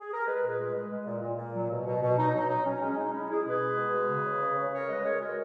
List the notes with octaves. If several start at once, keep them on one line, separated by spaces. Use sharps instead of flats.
G#4
A#4
G#3 G#4 B4
A#2
G#4 B4
G#3
G#3
G#3
A#2
A#2
A#2
F#3
B2
B2
B2
F#3 D#4
F#3 D#4
F#3 D#4
F#3 C#4
G#3 C#4
G#3 D#4
G#3 C#4 E4
G#3 E4 G#4
B2 G#4 B4
G#3
B2
G#3
C#3
C#3
C#3
C#3
C#3 A#4 C#5
G#3 B4 D#5
G#3 A#4 C#5
G#3 F#4 A#4